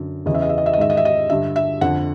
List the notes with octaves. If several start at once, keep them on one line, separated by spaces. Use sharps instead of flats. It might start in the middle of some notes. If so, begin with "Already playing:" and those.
Already playing: F#2 D3
E2 C#3 E3 D#5
E5
D#5
E5
D#5
E5
D#5
G#2 D#3 E5
D#5
E5
D#5
G2 D3 E5
E5
F2 D3 F#5